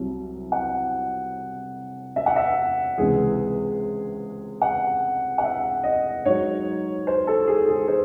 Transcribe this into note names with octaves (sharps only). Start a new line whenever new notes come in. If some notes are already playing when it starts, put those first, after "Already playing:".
Already playing: C2 C3 F#3
F#5
E5
F#5
E5
C#2 C3 E3 G#3 G#4
F#5
F#5
E5
D#5
G#2 F#3 C#5
C5
A4
G#4
G#4
C5